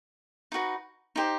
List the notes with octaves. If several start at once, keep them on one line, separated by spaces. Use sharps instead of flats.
D#4 F#4 B4
D#4 G4 C5